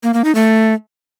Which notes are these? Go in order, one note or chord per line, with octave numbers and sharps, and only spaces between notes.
A#3
A#3
D#4
A3